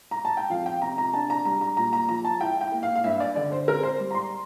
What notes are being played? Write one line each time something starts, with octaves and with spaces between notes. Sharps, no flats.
A#5
A5
G5
F2 F5
G5
C3 A#5
A#5
D4 A5
A#5
G3 A#5
A#5
A#2 A#5
A#5
F3 A#5
A5
E4 G5
G5
A#3
F5
F5
G2 E5
D5
D3 D5
C5
C4 A#4
C5
G3
A#5
C6